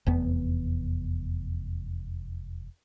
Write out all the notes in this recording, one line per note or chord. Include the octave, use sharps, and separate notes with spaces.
F1 E2 B3